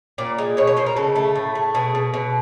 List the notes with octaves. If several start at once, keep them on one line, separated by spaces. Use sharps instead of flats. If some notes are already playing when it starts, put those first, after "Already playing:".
A#2 D5
G#3
B2 C#5
C#5
B2 C5
A#4
C#3 A4
A3
A2
A3
B2 G#4
B2
B2